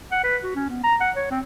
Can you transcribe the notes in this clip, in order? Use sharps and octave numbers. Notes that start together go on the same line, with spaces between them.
F#5
B4
F#4
C#4
B3
A#5
F#5
C#5
C4